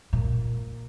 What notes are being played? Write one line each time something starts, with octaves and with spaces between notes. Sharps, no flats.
A#2